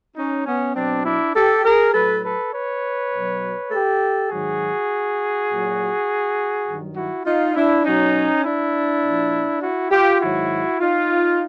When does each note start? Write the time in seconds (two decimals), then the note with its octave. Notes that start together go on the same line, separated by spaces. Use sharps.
0.17 C#4 D#4
0.46 B3 C#4
0.75 B2 F#3 C4 D4
1.05 D4 E4
1.35 G4 A4
1.64 G#4 A#4
1.94 A2 F#3 A4 B4
2.24 A4 B4
2.53 B4 C#5
3.12 B2 F#3
3.71 G4 A4
4.30 G#2 D#3 F#3 F#4 G#4
5.49 A#2 F#3
6.67 G2 D#3 F#3
6.96 E4 F#4
7.25 D#4 F4
7.55 D4 E4
7.84 B2 F#3 C#4 D#4
8.44 D4 E4
9.02 A#2
9.08 F3
9.62 E4 F#4
9.91 F4 G4
10.21 G#2 D#3 F#3 E4 F#4
10.80 D#4 F4